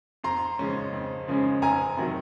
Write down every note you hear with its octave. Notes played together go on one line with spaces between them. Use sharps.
F2 A#5 C6
C#3 F3 G#3 C#4
F2
C#3 F3 G#3 C#4
F1 G#5 A#5
C3 D#3 F#3